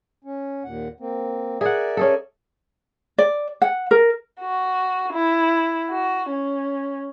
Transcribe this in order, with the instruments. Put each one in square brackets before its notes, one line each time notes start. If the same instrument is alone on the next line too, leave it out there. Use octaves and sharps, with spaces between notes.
[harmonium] C#4
D#2 A#2 F#5
A#3 C4
[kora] G#4 F#5 [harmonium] A#4 D5 E5
[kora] C#4 G#4 A4
[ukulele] D5
F#5
A#4
[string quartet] F#4
E4
F#4
C#4